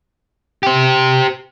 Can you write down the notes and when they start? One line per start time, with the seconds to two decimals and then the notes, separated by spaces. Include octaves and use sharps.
0.63 G4 C5